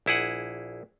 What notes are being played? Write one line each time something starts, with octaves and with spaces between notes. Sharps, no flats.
A#1 E4 G#4 F#5